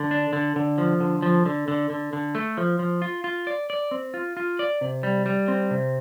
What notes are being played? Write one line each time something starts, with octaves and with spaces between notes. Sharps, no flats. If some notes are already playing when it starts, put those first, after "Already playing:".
Already playing: D3
D4
D3
D3
F3
D3
F3
D3
D3
D3
D3
A3
F3
F3
F4
F4
D5
D5
C4
F4
F4
D5
C3
G3
G3
C4
C3